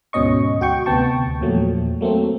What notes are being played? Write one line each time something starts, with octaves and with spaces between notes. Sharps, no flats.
D2 G#2 B2 C#4 D#5 C#6
F#4 G5 C#6
D2 C3 B3 G5 A5 C#6
E2 A#2 F3 F#3 A3
F#3 A3 A#3 C4